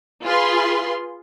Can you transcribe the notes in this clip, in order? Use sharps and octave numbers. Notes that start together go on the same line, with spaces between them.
F4 G#4 B4 C6